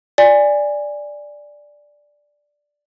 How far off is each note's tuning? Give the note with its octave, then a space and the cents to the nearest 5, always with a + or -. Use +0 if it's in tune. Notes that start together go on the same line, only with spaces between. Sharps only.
D5 +0 G#5 -15